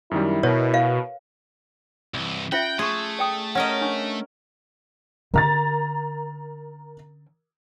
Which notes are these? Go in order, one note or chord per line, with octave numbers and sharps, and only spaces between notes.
F#2 D#3 G3 E4
B2 A#4 B4 C#5
F5
C2 E3
C#4 F4 E5 F#5 G5
A3 G#4 C6 C#6
D5 G5 D#6
C#4 A#4 D#5 F#5
D4 C#6
D3 C#4 A#4 A#5 A6